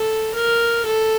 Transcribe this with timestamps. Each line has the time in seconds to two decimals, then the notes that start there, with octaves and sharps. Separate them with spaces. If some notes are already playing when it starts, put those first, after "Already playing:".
Already playing: A4
0.34 A#4
0.86 A4